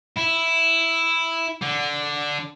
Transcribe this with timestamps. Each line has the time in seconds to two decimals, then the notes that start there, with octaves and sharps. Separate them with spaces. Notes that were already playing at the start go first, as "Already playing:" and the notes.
0.16 E4
1.62 D3